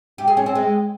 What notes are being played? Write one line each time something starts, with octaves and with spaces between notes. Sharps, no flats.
G4
G#4
C#4
C4
G#3